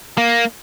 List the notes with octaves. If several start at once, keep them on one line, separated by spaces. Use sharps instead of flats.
A#3